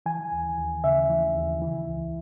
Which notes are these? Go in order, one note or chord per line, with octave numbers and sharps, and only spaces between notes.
E3 G#5
D#2
D#2
C#3 E5
E3
D#2
E3
C#2